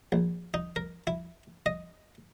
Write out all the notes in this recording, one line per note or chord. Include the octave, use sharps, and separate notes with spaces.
A#1
D#4
A#4
E4
D#5